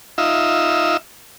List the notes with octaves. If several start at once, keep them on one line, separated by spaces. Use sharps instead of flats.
D#4 F4 E5